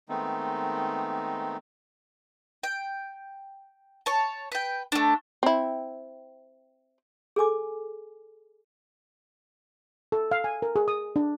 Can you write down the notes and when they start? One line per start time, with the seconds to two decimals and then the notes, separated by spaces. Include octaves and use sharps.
0.09 D#3 G#3 A3 B3 C4 D#4
2.63 G5
4.06 C#5 A5
4.52 B4 G5
4.92 A3 D4
5.43 C4 E4
7.36 G#4 A4 G#5 D6
10.12 A4
10.31 F5
10.44 G#5
10.62 A#4
10.76 G#4
10.88 D#6
11.16 D4